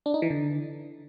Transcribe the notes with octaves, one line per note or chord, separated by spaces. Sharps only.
D4
D#4
E3
D3